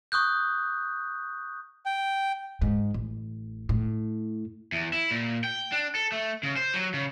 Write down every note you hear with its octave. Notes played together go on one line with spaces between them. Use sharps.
C#6 D#6 F#6 G6
G5
G#2
A1
A2
E2
E4
A#2
G5
D4
A4
A3
C#3
C5
F#3
C#3